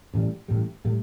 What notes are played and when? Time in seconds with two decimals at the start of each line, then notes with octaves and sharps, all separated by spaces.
0.14 A1 A2 G3
0.48 A1 A2 G3
0.85 A2 G3